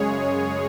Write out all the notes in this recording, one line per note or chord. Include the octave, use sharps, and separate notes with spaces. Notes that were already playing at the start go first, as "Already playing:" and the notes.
Already playing: F#2 C#3 G#3 G#4 C#5